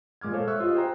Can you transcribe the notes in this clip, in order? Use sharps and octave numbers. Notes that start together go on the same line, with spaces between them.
A#2 G#3 D6 F6 G#6
A4 C5 C#5 F5
E5 C#6 E6 F#6
F4 G4 D#5 F5
G#4 C5 G5 A#5